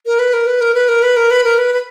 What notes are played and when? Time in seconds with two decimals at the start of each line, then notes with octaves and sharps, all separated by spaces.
0.06 A#4
0.19 B4
0.33 A#4
0.47 B4
0.61 A#4
0.74 B4
0.89 A#4
1.03 B4
1.16 A#4
1.31 B4
1.44 A#4
1.58 B4
1.73 B4